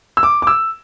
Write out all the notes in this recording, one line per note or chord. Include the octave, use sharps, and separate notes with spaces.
E6
D6
D6
E6